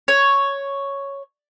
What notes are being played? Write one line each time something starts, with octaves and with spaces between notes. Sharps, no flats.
C#5